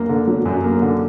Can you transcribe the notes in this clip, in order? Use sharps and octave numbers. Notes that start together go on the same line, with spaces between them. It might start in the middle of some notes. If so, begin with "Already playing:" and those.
Already playing: F#2 A#3
D3
F#3
F#2
A#3
D3